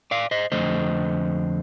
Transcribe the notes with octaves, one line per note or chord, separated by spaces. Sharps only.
D5 F5
C5 D#5
F2 D3 A3 C5 D#5